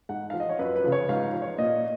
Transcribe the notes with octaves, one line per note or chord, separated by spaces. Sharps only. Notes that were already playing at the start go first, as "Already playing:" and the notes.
G#2 F#5
F3 F5
D#5
C#5
F#2 B4
B4
C#3 F3
C#5
G#2 F5
F3
C#5
A#2 D#5